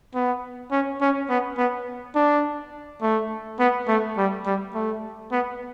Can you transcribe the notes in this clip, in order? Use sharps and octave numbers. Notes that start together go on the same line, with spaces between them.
B3
C#4
C#4
B3
B3
D4
A3
B3
A3
G3
G3
A3
B3